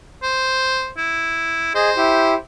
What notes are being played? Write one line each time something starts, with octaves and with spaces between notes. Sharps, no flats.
C5
E4
G#4 C5 D#5
E4 G4